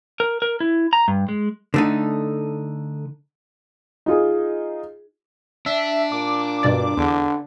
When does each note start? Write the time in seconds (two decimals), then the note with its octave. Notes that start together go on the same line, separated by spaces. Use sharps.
0.20 A#4
0.42 A#4
0.60 E4
0.93 A#5
1.08 G2
1.29 G#3
1.74 D3 A3 D#4
4.06 D#4 F4 G#4
5.66 D4 E5
6.12 A#2 D6
6.63 G2 B2 D5
6.97 E2 D3